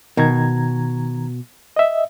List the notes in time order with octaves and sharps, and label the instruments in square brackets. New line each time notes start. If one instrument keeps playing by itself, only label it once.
[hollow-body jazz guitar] B2 [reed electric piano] D#3 A#5 G#6
[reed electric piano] D#5 E5